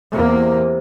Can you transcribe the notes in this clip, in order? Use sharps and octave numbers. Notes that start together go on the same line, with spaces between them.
E2 C3 A#3